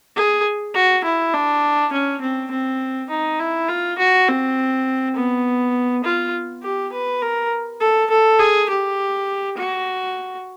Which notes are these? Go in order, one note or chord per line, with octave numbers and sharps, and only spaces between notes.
G#4
F#4
E4
D4
C#4
C4
C4
D#4
E4
F4
F#4
C4
B3
F4
G4
B4
A#4
A4
A4
G#4
G4
F#4